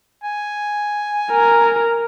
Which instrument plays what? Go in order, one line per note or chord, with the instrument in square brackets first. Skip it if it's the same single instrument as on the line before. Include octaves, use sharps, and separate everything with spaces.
[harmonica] G#5
[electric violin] A#4